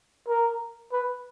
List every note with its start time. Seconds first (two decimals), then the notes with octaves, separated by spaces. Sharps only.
0.28 A#4
0.92 B4